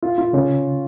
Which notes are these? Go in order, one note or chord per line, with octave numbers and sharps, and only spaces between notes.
F4
F4
C#3 C#4